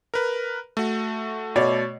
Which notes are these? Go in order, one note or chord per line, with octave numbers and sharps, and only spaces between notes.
A#4 B4
A3 F#4
B2 C#5 D5